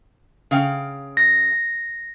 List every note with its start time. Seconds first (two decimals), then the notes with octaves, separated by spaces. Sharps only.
0.51 C#3 F5 G5
1.17 A#6